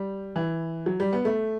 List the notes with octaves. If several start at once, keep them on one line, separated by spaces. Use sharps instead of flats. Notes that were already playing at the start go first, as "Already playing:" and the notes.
Already playing: G3
E3
F#3
G3
B3
A3